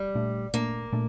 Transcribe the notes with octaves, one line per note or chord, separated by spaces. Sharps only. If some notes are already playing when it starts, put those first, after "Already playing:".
Already playing: G3
A#2 A3 D4
A#2 A3 A#3 D4
A#2 A3 D4